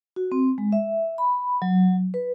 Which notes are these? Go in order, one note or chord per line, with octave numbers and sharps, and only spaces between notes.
F#4
C4
G#3
E5
B5
F#3
B4